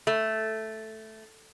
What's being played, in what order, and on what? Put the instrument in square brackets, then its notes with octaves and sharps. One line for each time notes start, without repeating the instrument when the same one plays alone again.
[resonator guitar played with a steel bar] A3